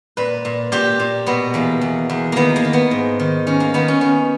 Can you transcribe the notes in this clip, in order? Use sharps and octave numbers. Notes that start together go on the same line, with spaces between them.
A#2 B4
A#2
A#2 G4
A#2
B2 B3
E2 A#3
E2
E2
D#3 A#3 B3
A#3
D#3
B3
G#2
D#3
D#3 C#4
A#3
D#3 B3
C#4
D#3 C#4